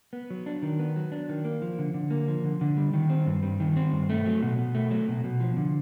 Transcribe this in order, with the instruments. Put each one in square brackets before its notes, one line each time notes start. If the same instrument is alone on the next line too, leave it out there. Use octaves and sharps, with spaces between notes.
[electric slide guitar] B3
F#3
D4
D#3
B3
F#3
D4
D#3
A#3
F3
D3
D3
A#3
F3
D3
D3
G3
D#3
C4
G2
G3
D#3
C4
G2
A3
F#3
B2
B2
A3
F#3
B2
B2
F3
D3